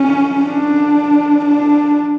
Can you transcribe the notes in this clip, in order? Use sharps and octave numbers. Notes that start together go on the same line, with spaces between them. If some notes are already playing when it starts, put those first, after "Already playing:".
Already playing: C#4
D4
D4